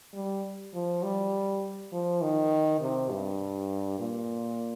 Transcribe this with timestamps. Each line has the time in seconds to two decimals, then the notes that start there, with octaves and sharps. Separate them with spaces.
0.14 G3
0.74 F3
1.03 G3
1.92 F3
2.22 D#3
2.81 C3
3.11 G2
3.99 A#2